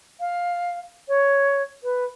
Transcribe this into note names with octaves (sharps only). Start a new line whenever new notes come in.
F5
C#5
B4